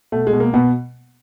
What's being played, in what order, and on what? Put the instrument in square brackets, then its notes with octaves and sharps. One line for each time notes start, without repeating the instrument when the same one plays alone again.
[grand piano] B2 A3
G#3
B2
A#3
B2 B3